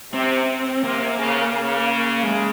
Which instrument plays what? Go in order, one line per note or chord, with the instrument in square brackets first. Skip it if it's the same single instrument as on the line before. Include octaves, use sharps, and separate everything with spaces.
[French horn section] C3 [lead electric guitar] C4
[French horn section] C3 [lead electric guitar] A#3
[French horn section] C#3
C#3
[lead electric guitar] G#3